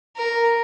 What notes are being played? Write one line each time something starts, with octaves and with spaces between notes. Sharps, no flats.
A#4